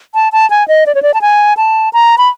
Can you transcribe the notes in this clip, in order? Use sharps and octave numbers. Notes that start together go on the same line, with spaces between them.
A5
A5
G#5
D#5
D5
C#5
D5
A5
G#5
A5
A#5
B5